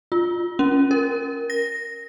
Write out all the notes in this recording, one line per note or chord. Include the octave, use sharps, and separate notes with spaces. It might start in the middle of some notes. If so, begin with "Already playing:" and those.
F4
C#4
A#4
A#6